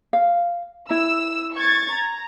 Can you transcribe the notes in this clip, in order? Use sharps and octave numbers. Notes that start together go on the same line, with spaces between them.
F5
E4 E6
C#6 G#6 A6
A#5